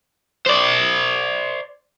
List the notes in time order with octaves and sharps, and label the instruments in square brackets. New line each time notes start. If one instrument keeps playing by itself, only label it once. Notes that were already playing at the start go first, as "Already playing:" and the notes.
[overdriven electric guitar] C5 D5